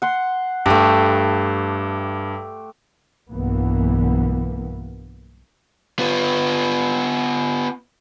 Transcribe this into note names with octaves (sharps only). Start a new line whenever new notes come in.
F#5 C6
G2 A3 G4
B1 G2 E3 A#3 B3
B3 F4